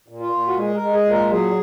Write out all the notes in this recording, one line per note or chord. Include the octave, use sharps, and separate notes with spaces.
A#2
F4
A#2
F#4
G#3 G#4
A#4
G#3
G#4
A#2
A#4
F#3 G#4